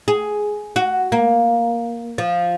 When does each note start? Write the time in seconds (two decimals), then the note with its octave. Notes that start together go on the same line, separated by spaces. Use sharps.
0.08 G#4
0.76 F#4
1.12 A#3
2.18 F3